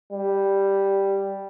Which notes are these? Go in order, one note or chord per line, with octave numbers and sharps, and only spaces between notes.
G3